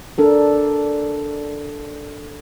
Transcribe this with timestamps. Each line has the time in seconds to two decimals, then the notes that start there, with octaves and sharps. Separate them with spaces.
0.18 D4 A4 A#4